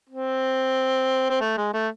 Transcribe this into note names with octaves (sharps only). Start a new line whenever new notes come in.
C4
C4
A3
G#3
A3